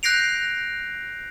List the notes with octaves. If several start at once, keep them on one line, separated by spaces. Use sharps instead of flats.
F#6 G6 A#6 C7 D7 F7